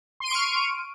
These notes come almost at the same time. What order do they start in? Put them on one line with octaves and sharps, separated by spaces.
C6 D#7 D7 C#6 F6